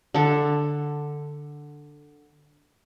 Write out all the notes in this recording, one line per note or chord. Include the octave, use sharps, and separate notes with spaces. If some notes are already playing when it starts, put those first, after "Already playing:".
D3 A4